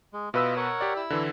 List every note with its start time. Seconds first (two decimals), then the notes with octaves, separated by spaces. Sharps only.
0.13 G#3
0.34 B2 F4 B4 D#5 E5 E6
0.56 A#4 C#5 F#5
0.81 G4 D5
0.96 E4 E6
1.10 D3 E3